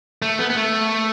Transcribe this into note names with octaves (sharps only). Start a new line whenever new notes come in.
A3
B3
B3
A3